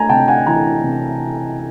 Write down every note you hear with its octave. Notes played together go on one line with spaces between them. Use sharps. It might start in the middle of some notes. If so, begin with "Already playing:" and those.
Already playing: A3 G#5 A#5
C3 G5 A5
F#5 G#5
E3 G#5 A#5
C3